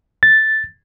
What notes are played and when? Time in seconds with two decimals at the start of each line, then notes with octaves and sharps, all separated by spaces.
0.23 A6